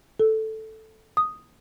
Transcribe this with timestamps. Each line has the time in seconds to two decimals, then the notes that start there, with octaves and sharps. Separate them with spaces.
0.20 A4
1.17 D#6